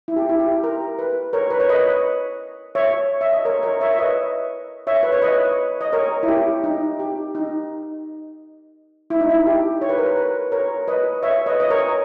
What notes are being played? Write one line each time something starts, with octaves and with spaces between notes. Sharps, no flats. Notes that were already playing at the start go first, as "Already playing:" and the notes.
E4
G4
E4
G4
A#4
B4
A#4 C#5
B4
C#5
B4 D#5
C#5 E5
E5
D#5
A#4 C#5
A#4 C#5
C#5 E5
E5
B4 D#5
C#5 E5
B4
C#5
B4 D#5
D#5
A#4 C#5
E4
G4
D#4
G4
D#4
E4
D#4
E4
G4
C#5
B4
A#4
B4
B4
A#4 C#5
B4 D#5
C#5 E5
B4 D#5
D#5
A#4 C#5